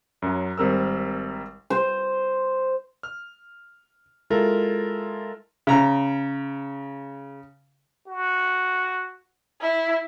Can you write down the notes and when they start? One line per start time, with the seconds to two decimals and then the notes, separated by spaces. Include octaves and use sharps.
0.22 F#2 F#3
0.58 G#1 G3 C4 A#4 E6
1.70 C5
3.03 F6
4.30 G#3 E4 F4 A4 A#4
5.67 C#3 A#5
8.08 F#4
9.61 E4